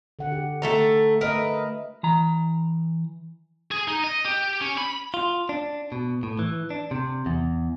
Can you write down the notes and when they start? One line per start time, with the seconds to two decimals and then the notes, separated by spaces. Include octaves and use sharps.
0.19 D3 F#5
0.32 G4
0.62 A3 A4 A#5
1.21 A3 A#4 B4 D#5 E5
2.03 E3 A#5
3.71 G#4
3.88 D#4
4.04 D#5
4.25 G4
4.61 C#4
4.78 B5
5.14 F4
5.49 D4
5.92 B2
6.23 A2
6.39 E3
6.70 D4
6.91 C3
7.26 E2